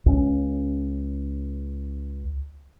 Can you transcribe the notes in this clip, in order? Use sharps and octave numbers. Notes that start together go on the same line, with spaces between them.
C#2 C#4